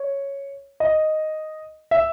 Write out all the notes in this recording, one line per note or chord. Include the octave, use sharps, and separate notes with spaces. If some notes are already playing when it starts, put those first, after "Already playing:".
Already playing: C#5
D#5
E5